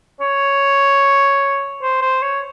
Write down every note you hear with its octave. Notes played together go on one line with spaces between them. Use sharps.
C#5
C5
C5
C#5